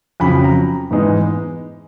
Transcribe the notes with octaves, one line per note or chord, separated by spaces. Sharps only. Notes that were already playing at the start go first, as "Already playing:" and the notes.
F2 C#3 F#3 B5
A#5
G#2 E3 G#3 B3 D#4